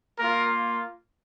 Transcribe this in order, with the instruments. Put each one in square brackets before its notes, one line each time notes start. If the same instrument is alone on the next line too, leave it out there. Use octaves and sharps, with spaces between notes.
[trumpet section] A#3 F4 A#4